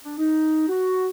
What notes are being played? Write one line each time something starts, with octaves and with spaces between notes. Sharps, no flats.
D4
D#4
F#4